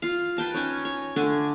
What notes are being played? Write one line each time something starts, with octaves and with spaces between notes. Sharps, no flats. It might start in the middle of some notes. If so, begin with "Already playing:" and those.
F4 F5
B4 G5 A5 A#5
C#4 D#4 C#5
C#5
D3 A3 D4 G#5